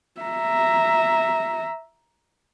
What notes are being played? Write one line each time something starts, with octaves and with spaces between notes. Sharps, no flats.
E5 A#5